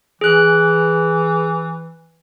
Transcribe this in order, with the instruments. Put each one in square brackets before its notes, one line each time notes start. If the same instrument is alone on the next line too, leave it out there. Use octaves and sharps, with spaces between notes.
[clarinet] E3 [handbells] G#4 F#6